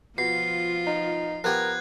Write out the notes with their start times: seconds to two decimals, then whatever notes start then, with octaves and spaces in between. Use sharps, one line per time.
0.18 B2 F3 F4 C7
0.87 D#4
1.44 F3 B3 G4 A#4 F#6 G#6